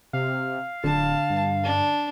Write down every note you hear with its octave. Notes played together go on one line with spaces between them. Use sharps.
C3 F5
D1 D3 A5
G2
D4